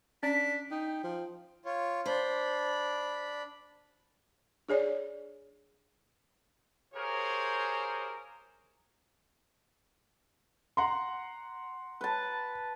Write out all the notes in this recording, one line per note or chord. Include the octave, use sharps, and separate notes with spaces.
C#4 D4 B6
D#4 G5
F3
F4 C#5
D4 C5 B5
D4 G#4 C#5 D5
F4 G4 G#4 A#4 C5 C#5
F#5 A#5 C6
B4 A5